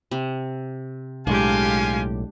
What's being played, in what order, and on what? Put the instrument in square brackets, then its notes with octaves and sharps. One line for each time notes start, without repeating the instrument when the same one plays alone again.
[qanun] C3
[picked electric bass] B1 A2 [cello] G#3 G4 [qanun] D4 [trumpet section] F4 F5 G#5